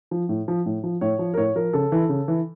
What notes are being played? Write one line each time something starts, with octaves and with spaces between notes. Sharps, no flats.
F3
A2
F3
A2
F3
A2 C#5
F3
A#4
A2 C#5
F3 A#4
C#3 A4
E3
C#3
E3